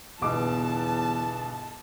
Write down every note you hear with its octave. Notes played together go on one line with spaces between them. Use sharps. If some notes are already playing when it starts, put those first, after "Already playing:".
G1 E2 B2 A5 D6